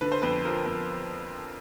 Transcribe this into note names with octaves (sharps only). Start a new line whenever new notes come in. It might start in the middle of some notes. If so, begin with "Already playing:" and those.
D3 B4
C5
F2 B4
F3 A#4
F2